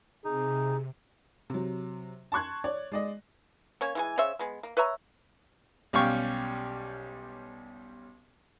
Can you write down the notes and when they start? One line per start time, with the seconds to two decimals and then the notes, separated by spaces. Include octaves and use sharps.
0.25 C3 D#4 G#4
1.50 C3 F#3
2.32 A5 C6 C#6 F#6 G#6
2.64 C#5 D5
2.92 G#3 D5 D#5
3.81 A#3 C#4 C#5
3.95 E3 G#3 G#5
4.18 C#3 C5 C#5 E5
4.39 G#3 B3
4.63 A#3
4.77 B4 C#5 E5 A#5
5.93 B1 G3 C#4 F5 G5 C#6